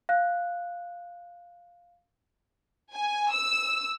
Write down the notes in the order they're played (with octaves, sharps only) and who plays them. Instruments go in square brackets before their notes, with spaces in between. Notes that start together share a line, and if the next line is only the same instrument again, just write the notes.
[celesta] F5 F#6
[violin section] G#5
E6